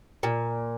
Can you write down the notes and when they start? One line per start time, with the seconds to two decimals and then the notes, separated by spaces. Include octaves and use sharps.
0.23 A#2